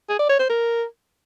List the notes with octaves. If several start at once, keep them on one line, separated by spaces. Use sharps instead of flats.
G#4
D5
C#5
C5
A#4